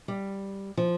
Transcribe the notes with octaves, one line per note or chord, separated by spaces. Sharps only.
G3
F3